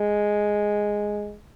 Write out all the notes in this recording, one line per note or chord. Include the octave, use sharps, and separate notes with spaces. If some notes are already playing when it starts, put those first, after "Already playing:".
Already playing: G#3